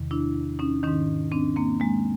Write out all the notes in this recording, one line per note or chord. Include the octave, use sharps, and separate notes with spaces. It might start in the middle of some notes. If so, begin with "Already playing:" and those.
Already playing: E2 C3 D#3
D4 E4
C#4 D#4
G#2 D#3 C#4 D#4
C4 D4
A#3 C4
G#3 A#3